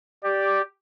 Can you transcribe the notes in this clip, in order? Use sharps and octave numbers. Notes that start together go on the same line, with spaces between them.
G4 D5